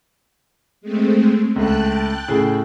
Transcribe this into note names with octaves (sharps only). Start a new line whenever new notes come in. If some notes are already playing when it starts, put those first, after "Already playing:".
G#3 A3 C4
C#2 A3 G5 A5 F#6
A2 C#3 G#4